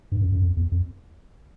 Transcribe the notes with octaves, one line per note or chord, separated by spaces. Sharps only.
G2
F#2
F#2
F2
E2
F2